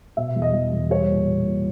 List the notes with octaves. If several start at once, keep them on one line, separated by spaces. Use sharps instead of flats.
B2 E5
E2
D#5
E2
E2
G3 C#5
A#2
A#2
A#2